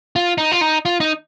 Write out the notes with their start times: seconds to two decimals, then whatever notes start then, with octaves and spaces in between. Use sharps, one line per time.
0.16 F4
0.38 D#4
0.52 F4
0.61 D#4
0.85 F4
1.00 D#4